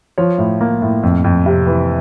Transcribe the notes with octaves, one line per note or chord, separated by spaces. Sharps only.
F3 C#5
A2
A#3
A2
F2
F2
C3
E3